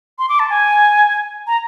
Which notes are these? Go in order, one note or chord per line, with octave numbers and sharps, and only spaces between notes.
C6
D6
A5
G#5
A#5